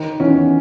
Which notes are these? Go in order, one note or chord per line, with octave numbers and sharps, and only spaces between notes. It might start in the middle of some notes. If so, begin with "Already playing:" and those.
Already playing: D#3
E2 C#4